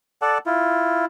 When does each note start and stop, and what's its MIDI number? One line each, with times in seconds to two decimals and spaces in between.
0.22 0.38 69
0.22 0.38 74
0.22 0.38 78
0.22 0.38 81
0.46 1.05 64
0.46 1.05 65